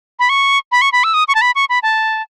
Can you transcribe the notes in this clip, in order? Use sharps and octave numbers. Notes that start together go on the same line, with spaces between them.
B5
C#6
B5
C#6
B5
E6
D#6
C#6
A5
B5
C#6
B5
A5